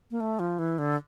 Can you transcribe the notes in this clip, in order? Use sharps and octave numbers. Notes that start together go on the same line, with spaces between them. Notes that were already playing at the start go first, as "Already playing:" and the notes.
A#3
A3
F3
E3
D3